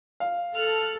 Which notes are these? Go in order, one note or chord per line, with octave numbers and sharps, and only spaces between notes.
F5
A4 F6 F#6